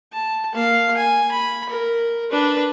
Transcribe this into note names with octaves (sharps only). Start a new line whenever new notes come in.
A5
A#3 F5
G#5
B5
A#4
D4 B4